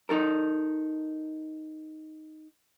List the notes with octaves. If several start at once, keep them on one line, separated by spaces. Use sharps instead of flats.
D#4 A4 A#4